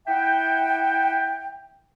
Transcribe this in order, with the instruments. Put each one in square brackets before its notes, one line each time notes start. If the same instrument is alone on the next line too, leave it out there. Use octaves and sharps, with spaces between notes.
[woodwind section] E4 E5 F#5 G5